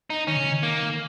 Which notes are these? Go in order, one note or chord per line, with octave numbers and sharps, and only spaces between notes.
D#4
D#3 C#4
C#3
D#3
A#3